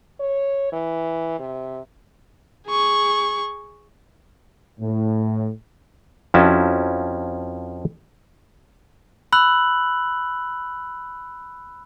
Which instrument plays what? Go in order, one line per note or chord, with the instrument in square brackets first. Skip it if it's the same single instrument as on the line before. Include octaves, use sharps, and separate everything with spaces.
[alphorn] C#5
E3
C3
[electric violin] G#4 C#6
[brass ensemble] A2
[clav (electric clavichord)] F2 F3 C#4 E4 F#4 A5
[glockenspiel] B5 E6 F#6 F#7